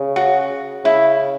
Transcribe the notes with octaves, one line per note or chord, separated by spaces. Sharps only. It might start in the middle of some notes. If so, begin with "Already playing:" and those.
Already playing: C#3
F#4
C#3 E4